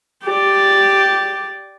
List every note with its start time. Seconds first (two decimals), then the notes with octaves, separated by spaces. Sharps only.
0.24 G4 D5